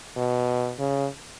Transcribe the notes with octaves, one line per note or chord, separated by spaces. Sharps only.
B2
C#3